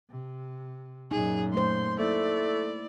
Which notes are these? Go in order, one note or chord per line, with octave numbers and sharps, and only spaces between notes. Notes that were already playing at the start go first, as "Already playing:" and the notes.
C3
F#2 A#2 D#4 G#4
A3 C5 C6
A3 A#3 E4 D5